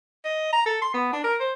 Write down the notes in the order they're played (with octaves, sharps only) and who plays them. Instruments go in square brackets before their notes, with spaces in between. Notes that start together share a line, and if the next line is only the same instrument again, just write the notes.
[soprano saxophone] D#5
A#5
A4
C6
B3
D4
A#4
C5